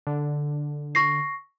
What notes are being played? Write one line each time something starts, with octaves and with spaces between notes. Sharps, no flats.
D3
C#6 A#6 C7